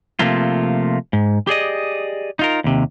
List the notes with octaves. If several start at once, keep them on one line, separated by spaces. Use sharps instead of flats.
C3 F3 A3 A#3 F4
G#2
G4 G#4 D5 D#5
D#4 F4 A#4
D#2 C3